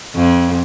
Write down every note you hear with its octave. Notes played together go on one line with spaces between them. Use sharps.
F2